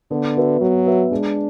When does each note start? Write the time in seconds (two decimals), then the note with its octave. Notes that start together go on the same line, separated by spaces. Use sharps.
0.11 D3 B3
0.37 F#4 B4 E5
0.61 F#3 B3
0.86 F#4 B4 E5
1.11 G#3 D4